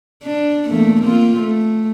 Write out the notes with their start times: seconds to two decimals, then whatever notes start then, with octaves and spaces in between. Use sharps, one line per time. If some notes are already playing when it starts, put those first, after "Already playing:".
0.23 D4
0.69 E2 A3 A#3
1.02 A#3 C4 F4
1.40 A3